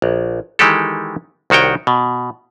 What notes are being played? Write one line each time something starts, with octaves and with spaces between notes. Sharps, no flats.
A#1
D#3 E3 G#3 G4 A4
C2 D#3 F#4 C#5 G5
B2